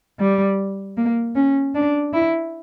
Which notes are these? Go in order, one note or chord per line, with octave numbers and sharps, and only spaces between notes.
G3
A#3
C#4
D4
E4